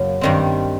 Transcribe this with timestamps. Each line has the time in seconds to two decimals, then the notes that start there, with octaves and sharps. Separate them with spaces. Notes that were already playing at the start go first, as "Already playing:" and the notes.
Already playing: F#2 C#3 F#3 A#3
0.21 G2 D#3 G3 C4